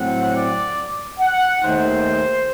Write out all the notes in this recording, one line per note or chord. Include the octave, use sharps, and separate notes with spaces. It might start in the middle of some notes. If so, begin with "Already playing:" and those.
Already playing: A2 F#3 C4 F#5
D5
F#5
D#2 D#3 A3 C5